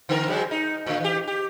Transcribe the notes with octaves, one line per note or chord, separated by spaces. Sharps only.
D3 B3 A#4
F#3 G#3 C4
D#4
A2 D3
E3 G4
G4